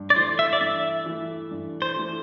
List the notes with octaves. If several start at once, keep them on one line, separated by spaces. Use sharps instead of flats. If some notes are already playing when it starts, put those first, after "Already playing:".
Already playing: G2
D5
E3 A3 C5
E5
D5
G2 E5
E3 A3
G2
C5
E3 A3